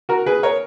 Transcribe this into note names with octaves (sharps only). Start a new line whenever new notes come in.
F#4 A#4
G#4 B4
A#4 C#5